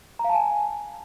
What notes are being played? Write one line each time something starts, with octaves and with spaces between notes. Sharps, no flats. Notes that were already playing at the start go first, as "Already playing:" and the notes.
A#5
F5
A5
G#5